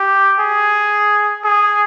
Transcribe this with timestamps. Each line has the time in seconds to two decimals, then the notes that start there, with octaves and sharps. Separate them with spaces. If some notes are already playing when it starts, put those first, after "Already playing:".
Already playing: G4
0.40 G#4
1.44 G#4